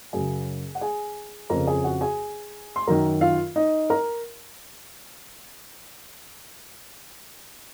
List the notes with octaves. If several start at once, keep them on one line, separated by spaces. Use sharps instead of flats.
F#2 C#3 G#4 G#5
F#5
G#4 G#5
F2 C#3 A#4 A#5
G#4 G#5
F#4 F#5
G#4 G#5
C6
F#2 D#3 A#4 A#5
F4 F5
D#4 D#5
A#4 A#5